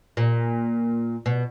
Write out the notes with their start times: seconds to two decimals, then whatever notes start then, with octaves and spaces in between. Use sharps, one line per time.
0.17 A#2
1.26 B2